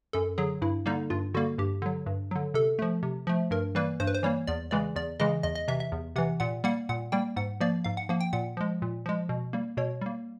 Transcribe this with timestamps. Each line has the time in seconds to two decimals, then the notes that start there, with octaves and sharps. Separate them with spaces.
0.13 F#2 A4
0.38 D3 F#3 G#4
0.62 G2 E4
0.86 D3 G3 A#3 D#4
1.10 G2 F4
1.34 D3 G3 A#3 F#4
1.58 G2 G4
1.82 D3 F#3
2.06 G2
2.31 D3 F#3
2.54 C3 A4
2.79 F3 A3
3.03 C3
3.27 F3 A3
3.51 G2 A#4
3.75 E3 G3 A#3 B4
4.00 G2 C5
4.07 B4
4.15 C5
4.23 E3 G3 A#3 C#5
4.47 E2 D5
4.71 C#3 E3 G#3 D5
4.96 E2 D5
5.20 C#3 E3 G#3 D#5
5.43 E2 D#5
5.55 D#5
5.68 C3 E3 E5
5.80 E5
5.92 E2
6.16 C3 E3 F#5
6.40 A#2 F#5
6.64 G3 A#3 F#5
6.89 A#2 F#5
7.12 G3 A#3 G5
7.36 G#2 F#5
7.60 F3 A#3 D5
7.84 G#2 F5
7.97 F#5
8.09 F3 A#3 F#5
8.21 G5
8.33 A#2 F#5
8.57 F3 G#3
8.82 A#2
9.06 F3 G#3
9.29 B2
9.53 G3 A#3
9.77 B2 C#5
10.01 G3 A#3